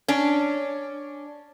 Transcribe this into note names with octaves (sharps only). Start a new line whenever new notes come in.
C#4 D4